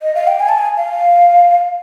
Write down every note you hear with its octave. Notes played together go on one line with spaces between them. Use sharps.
D#5
F5
G5
G#5
A5
G#5
F5